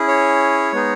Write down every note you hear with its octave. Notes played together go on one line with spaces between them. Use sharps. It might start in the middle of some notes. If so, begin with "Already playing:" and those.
Already playing: C#4 E4 G#4
C#5
G#3 B3 D#4 G#4